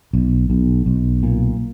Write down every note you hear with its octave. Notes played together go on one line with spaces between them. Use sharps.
B1
B1
B1
A#2